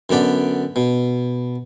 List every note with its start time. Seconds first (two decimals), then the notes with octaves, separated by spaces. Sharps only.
0.10 F#2 D3 B3 D5 B5
0.76 B2